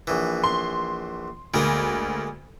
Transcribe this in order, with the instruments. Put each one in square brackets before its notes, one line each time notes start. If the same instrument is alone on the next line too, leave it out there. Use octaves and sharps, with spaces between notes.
[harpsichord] A#1 E3
[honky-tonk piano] C6
[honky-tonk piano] D2 [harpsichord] G#3 A#3